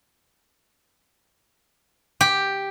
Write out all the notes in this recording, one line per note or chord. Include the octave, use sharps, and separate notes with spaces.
G4